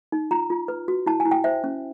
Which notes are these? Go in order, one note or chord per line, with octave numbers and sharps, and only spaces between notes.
D#4
F4 A#5
F4
B4
F#4
E4 A5
G#5
E4
G5
C5 E5
C#4